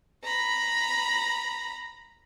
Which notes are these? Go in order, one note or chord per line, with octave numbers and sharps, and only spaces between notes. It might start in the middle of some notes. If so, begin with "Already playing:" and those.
A#5 B5